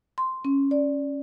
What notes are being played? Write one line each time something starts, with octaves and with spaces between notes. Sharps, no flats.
C6
C#4
D5